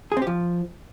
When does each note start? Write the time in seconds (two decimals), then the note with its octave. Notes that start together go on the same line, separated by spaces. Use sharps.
0.12 G#4
0.17 C4
0.22 G4
0.27 F3